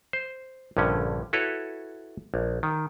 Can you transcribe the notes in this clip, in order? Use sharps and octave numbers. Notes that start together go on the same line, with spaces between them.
C5
A#1 G2 D3 C#4
E4 F#4 A4 B4 C#5
A#1
D#3